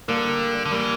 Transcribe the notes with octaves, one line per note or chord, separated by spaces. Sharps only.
D3 G3 A#3
D3
E3 G3 A#3